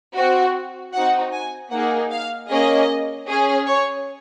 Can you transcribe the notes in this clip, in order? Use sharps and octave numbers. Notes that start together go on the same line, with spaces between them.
C4 F#4
C4 D#4 F#4 F#5
G#5
A#3 D#4 G#4 F#5
F5
A#3 C#4 G#4 D#5
C#4 G#4
C#5